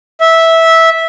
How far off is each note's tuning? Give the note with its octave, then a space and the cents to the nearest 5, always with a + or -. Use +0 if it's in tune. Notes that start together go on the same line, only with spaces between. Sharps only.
E5 -10